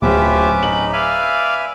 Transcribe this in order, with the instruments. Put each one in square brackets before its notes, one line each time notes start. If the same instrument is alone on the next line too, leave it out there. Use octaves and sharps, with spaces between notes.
[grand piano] D1 [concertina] C#4 B4 D6 [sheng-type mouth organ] F4 G4 E5
[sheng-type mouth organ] D#4 [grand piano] F#7
[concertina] B4 E5 G#5 [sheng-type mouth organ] D5 F5